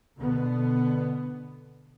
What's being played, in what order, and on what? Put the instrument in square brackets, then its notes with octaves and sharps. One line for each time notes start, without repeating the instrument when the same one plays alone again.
[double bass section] B2 D3 B3